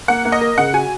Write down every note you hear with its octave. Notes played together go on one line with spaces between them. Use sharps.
A#3 F#5
A#3
D#5
A#4
C#3 F#5
F#4 G#5